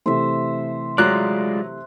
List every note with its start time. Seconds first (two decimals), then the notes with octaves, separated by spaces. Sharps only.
0.06 C3 E3 A3 C5 E5
0.98 F#3 G#3 F4 D5 F#6